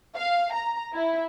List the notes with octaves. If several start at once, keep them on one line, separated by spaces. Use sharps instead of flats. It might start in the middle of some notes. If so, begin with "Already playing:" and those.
F5
A#5
E4